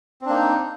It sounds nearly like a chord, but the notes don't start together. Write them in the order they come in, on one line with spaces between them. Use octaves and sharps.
C4 D4 A#3 D#4